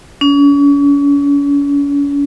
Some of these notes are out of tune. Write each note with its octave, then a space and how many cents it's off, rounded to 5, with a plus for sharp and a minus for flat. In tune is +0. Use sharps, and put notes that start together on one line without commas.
C#4 +40